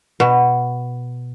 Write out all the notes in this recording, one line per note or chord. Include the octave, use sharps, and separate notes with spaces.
B2